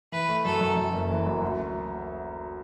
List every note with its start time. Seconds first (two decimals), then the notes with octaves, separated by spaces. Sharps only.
0.12 E3 B4
0.29 A3
0.45 F#2 A4
0.61 F#2
0.77 F#2
0.94 F#1
1.10 E3
1.27 F#2
1.42 D2